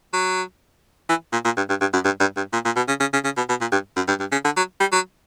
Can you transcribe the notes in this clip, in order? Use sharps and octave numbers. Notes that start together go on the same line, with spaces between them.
F#3
E3
A#2
A#2
G2
G2
G2
F#2
G2
G2
G2
A#2
A#2
B2
C#3
C#3
C#3
C#3
B2
B2
A#2
G2
F#2
G2
G2
C#3
D3
F#3
G3
F#3